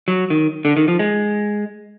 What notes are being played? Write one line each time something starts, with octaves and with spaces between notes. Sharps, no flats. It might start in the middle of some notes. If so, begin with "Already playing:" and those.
F#3
D#3
D3
D#3
F3
G#3